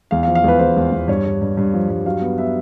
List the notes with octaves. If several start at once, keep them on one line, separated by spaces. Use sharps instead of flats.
E2 F5
F5
F3
F5
E2 B4
E2 C5
E2
E2
G2 C#5
G2
G2
G2
F3
G2
F#3 F5
B3
B3 E5